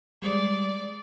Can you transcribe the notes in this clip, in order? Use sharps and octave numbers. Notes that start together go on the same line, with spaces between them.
G3 G#3 D5